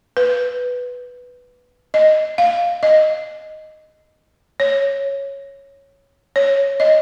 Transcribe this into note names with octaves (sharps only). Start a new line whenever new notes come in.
B4
D#5
F5
D#5
C#5
C#5
D#5